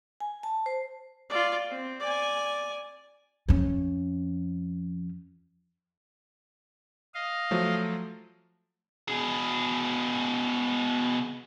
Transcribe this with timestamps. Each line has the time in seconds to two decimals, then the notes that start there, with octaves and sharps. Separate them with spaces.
0.20 G#5
0.43 A5
0.66 C5
1.30 F4 D5
1.69 C4
2.00 D5 G#5
3.49 F2 C#4
7.14 D#5 F5
7.51 F3 F#3 A3
9.08 B2 G#4